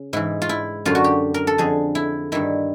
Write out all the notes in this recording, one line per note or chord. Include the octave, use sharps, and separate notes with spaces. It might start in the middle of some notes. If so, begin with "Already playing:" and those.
Already playing: C#3
G#2 E3 E4
F4
E4
F#2 D3 F4
F#4
G4
A#4
A4
F2 D3 G#4
E4
G2 D#3 E4